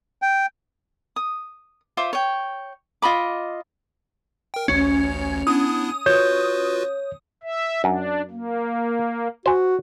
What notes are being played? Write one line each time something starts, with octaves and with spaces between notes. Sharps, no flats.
G5
D#6
F4 C5 E5 D6
C#5 G5
F4 D#5 B5 D6
A#4 G5
A1 D2 C#4
B3 D4 E4 D#6
F4 F#4 B4 C#5 G6
E5
F#2 D4
A#3
F#4 C5 G#5